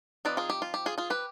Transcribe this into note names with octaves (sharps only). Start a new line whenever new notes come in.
F3 C4 D#4 B4 D5
F4 G#4
G4
F4
G4
F4 G#4
F4 G#4
G4 B4